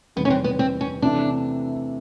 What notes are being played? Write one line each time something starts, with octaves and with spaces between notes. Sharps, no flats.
E2 C3 D#3 G3 B3
C#4
C4
B3
C4
C#4
C3 E3 A3 D4